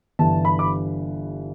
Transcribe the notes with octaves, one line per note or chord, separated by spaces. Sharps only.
G1 G2 E3 A5
B5
D6